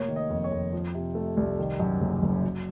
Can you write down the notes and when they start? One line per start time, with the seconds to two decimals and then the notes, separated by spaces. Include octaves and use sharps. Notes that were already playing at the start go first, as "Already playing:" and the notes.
Already playing: F1 A#3 C#5
0.09 D#3
0.16 D#5
0.30 F2
0.44 C#5
0.52 F2
0.73 F3
0.94 C3
1.15 A3
1.37 C2
1.59 D#3
1.80 F#2
2.00 F#1
2.22 F#1
2.44 F#3